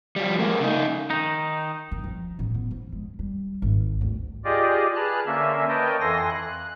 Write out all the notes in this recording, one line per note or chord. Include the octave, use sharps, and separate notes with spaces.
F3 G3
G#3 A#3
C#3 D#4
D#3 D#4
D#3
F3
A1
B3
F3
G#3
G3
G#1
D2
F4 G4 G#4 D5 D#5
G#4 B4 A5 F6 F#6
D3 A#3 C#4 E5
A#4 B4 C#5 D#5 G5 A5
F2 E3 A4 G#5 C6 A#6
F#6